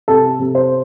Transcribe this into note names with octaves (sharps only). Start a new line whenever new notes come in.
C3 A4
C3
C5